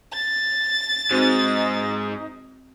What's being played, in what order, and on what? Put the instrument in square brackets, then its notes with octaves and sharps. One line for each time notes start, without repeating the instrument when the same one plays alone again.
[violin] A6
[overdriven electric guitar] G#2 G#3 [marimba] C4 F#4 C5 [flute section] D#4 D#6